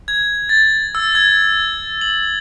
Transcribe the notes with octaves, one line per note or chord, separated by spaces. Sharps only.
G#6
A6
E6
G#6
F#7